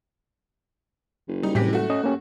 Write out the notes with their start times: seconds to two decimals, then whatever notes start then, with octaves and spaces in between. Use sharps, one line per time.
1.28 F#1
1.43 G3 D#4
1.55 A2 C3 E3 G4 B6
1.73 A3 F#4
1.90 C#4 D#5
2.04 A#3 C#4 G4